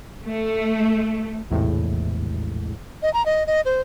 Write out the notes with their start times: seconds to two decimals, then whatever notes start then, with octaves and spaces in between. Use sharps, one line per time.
0.25 A3
1.50 A#1 E2 A2 C3 G#3
3.03 D#5
3.14 A#5
3.26 D#5
3.47 D#5
3.65 C5